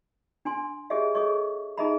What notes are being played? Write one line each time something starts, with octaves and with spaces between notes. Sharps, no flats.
D4 G#5 C6
G4 G#4 C#5 D#5 E5
G#4 A4 C#5 D#5 C#6
D#4 G#4 D#5 E5 A#5 B5